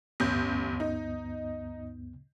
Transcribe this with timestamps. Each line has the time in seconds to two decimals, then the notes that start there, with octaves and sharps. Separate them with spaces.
0.20 A1 D2 G2 B3 G6
0.80 D#4